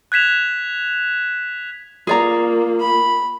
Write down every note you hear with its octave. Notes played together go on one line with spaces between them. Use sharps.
F#6 G#6 B6 E7 F7
A#3 F4 G#4 D5 A#5
B5